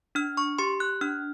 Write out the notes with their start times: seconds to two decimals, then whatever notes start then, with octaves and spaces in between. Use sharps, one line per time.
0.15 D4 F6
0.37 C#6
0.59 G4 C6
0.80 F#6
1.01 D4 F6